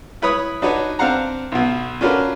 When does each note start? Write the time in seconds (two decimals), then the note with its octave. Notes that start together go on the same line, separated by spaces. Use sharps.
0.22 E4 B4 C#5 B5 D#6
0.62 D4 D#4 F#4 B4 C#5
0.99 C4 D4 F5 F#5 A#5
1.52 B1 B2
2.01 C#4 D4 F4 F#4 A#4 B4